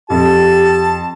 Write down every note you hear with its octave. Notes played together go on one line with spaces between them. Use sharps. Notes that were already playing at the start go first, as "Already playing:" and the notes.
F2 G4 A5